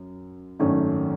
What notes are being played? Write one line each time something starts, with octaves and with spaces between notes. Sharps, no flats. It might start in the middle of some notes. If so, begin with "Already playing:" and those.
Already playing: F#2
G#1 F#2 D#3 A3 C#4